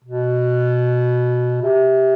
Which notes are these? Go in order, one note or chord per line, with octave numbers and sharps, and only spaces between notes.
B2
C3